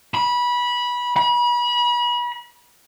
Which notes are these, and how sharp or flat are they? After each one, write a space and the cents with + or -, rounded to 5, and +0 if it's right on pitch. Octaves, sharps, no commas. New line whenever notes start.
B5 -20
B5 -35